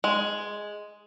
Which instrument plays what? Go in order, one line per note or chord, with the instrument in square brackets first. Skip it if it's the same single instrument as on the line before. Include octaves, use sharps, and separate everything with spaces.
[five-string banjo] G#3